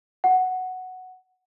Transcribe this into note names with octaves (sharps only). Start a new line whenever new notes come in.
F#5